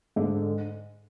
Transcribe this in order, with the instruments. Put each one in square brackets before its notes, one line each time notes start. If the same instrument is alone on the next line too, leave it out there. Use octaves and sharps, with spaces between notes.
[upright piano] G#2 [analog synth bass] D3